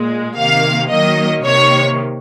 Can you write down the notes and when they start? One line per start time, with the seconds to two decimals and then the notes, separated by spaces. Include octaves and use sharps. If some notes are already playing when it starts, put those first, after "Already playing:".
Already playing: A#2 G#3
0.37 C3 D#3 A#3 F5
0.91 D#3 F#3 A#3 D#5
1.44 C3 D#3 A#3 C#5